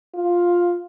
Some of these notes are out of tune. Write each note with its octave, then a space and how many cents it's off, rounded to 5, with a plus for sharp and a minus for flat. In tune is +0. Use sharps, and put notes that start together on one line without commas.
F4 +5